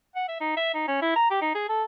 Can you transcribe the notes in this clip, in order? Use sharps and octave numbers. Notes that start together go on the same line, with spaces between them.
F#5
E5
D#4
E5
D#4
C#4
E4
A#5
G4
D#4
G#4
A4